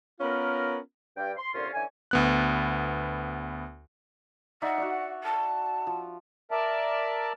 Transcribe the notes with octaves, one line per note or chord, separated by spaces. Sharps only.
B3 C#4 F4 A#4
G2 G5
C6
C2 A#2 D3 C#4 F4 C6
D3 E3 C#4 G#5
D2 B3 F#6
D#4 D5 E5 F#5
F#4 C#5 D5
A5
F3
A#4 D5 E5 A5